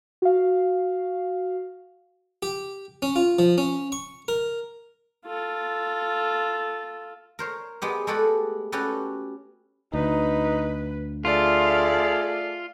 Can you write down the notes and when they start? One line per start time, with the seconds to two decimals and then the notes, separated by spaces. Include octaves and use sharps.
0.22 F#4 F5
2.43 G4
3.02 C#4
3.16 F4
3.39 F3
3.58 C#4
3.92 C#6
4.28 A#4
5.26 F4 A4
7.39 A#4 C5 C#5
7.82 G#3 B3 G4
8.07 G#3 A3 G4 A4 B4 F#5
8.72 C#4 F#4 G4 A4 B4
9.93 D2 D#4 B4
11.25 A3 F4 G#4 D5